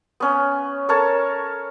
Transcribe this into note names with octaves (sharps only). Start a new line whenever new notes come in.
B3 C#4
A4 A#4 C#5 A5